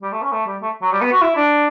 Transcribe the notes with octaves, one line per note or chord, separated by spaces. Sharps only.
G3
A3
C#4
A3
G3
A3
F#3
G3
B3
F#4
E4
D4